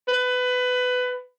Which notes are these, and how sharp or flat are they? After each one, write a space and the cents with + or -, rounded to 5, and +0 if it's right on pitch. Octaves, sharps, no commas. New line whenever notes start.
B4 +20